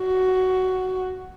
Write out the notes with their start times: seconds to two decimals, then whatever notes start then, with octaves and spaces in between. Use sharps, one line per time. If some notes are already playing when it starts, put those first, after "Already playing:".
Already playing: F#4